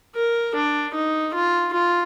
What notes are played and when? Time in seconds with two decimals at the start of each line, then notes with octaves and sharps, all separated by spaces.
0.15 A#4
0.55 D4
0.94 D#4
1.34 F4
1.73 F4